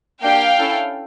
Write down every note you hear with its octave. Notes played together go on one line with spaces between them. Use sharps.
A#3 D4 G4 F5 G5
C#4 E4 A4